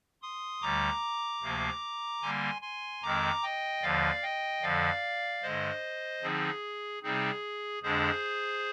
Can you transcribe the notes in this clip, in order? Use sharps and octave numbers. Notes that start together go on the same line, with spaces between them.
C6 D#6
D2 D3 G3 A#5 D6
D2 C3 F3 A#3
D3 G3 A#3 G#5 C6
G#5 C6
F2 D#3 G#3 C4 A#5 D6
D#5 G5
D#2 D3 F3 D5 F5
D#5 G5
F2 D3 F3 D5 F5
G2 D3 G#3 C5 D#5
D3 F3 C4 D#4 G#4
C3 G3 C4 D#4 G#4
F2 D3 G#3 D4 G#4 C5